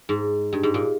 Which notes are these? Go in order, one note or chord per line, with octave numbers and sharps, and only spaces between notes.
G#2
G2
G#2
A#2